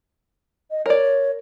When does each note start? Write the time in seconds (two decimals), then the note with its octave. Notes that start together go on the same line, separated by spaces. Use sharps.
0.71 D#5
0.86 A#4 C#5 D5